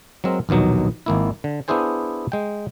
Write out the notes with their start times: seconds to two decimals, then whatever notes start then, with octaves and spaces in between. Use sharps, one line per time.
0.24 F#3 G#3 C4 A#4
0.49 A#1 D#2 B2 F#3 D#4
1.06 G#1 A#3 E4
1.44 D3
1.68 B3 D4 E4 G#4 C5 G#5
2.32 G#3 G5